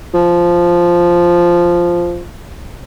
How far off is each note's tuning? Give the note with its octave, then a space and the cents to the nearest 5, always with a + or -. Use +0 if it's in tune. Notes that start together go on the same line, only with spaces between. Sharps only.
F3 -5